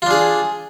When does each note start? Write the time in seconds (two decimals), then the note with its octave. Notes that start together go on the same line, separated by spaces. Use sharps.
0.02 F4
0.06 D4
0.11 G#4